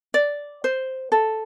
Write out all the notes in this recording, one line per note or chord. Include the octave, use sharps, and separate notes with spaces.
D5
C5
A4